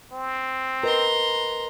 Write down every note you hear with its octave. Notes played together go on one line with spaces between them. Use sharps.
C4
A#4 B4 D#5 A#5 C6